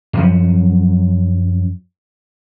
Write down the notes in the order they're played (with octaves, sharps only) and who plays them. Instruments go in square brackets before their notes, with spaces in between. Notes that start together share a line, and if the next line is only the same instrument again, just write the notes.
[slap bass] F#2 F3 F#3